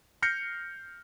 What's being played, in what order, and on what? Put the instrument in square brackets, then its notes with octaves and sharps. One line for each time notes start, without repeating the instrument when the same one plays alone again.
[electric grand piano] F6 G6 A#6 C7 C#7